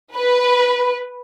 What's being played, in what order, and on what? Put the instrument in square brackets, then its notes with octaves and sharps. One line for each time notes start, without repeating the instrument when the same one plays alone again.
[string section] B4